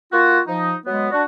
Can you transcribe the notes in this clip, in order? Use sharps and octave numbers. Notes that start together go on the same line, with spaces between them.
A#3 F4 F#4
F3 D#4
F#3 G#3 B3
D4 F#4